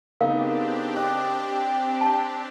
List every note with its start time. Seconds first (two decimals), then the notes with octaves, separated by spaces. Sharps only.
0.21 C#3 B3 C4 D4 D#4 G4 A#4 F5
0.96 D#5 G5 D6 F#6
2.01 A5